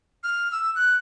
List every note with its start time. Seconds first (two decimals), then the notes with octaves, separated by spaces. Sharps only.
0.24 F6
0.52 E6
0.76 F#6